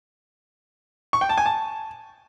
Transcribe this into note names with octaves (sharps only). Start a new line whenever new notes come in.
C#6
G5
A5
G#5
A5